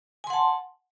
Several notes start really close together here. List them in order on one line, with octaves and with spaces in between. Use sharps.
G#5 C6 F#5 A5